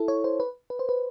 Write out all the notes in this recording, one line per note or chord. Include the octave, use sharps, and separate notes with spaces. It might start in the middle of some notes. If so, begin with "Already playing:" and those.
Already playing: E4 A4
C#5
C5
B4
B4
C5
B4